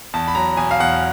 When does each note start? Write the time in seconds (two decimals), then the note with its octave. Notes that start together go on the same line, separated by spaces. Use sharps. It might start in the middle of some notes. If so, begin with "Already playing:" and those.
0.14 E2 A5
0.28 B5
0.35 F#3 A#5
0.57 B2 G#5
0.71 F5
0.80 E2 F#5